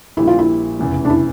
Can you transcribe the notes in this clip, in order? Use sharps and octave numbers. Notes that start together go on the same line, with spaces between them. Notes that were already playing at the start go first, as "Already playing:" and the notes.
A#1 A#2 G3 E4
F4
E4
F1 E2 C#3 E3
D4
E4